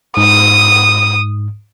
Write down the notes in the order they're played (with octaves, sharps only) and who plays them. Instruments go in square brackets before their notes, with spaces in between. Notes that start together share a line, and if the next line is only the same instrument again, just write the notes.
[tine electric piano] G#2 [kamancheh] D#6